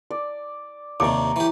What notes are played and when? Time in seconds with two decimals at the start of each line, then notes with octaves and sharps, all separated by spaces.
0.10 D5
1.00 D#2 C3 C#5 D5 A#5 D6
1.36 E3 G4